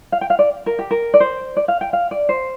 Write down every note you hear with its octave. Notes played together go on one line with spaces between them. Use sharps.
F5
G5
F5
D5
A#4
G4
A#4
D5
C5
D5
F5
G5
F5
D5
C5